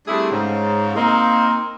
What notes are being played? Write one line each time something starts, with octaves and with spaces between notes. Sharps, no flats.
G3 A3 C4 D4 E4 G#4
G#2 C#3
A#3 C4 D#4